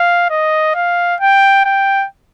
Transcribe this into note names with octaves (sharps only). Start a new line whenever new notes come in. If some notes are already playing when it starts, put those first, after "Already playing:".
Already playing: F5
D#5
F5
G5
G5